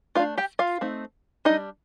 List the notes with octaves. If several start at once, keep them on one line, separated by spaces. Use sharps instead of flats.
A3 D4 F4 F5
G4 G5
F4 F5
A3 C4 D#4
G3 D4 D#4 D#5